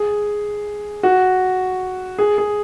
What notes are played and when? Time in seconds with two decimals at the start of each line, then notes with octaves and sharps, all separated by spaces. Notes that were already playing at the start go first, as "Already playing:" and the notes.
Already playing: G#4
1.03 F#4
2.18 G#4
2.38 G#4